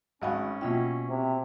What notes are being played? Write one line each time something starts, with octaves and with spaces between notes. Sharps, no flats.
G#1 F#3 C#4 D#5 F5 F#5 B5
B2 A#3 E4 F4 G5
C3